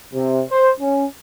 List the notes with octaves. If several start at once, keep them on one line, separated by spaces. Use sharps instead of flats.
C3
C5
C#4